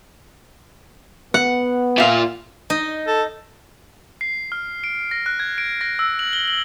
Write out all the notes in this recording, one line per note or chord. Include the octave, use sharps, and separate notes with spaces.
B3 F#5
A#2 F4 E5 F5
D#4 D#5
A4
C7
F6
D7
A#6
F#6
G#6
D7
A#6
E6
F#7
G7
F#7